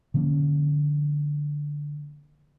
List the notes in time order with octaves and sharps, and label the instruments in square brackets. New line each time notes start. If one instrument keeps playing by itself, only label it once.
[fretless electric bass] D3 F3 A#3 C#4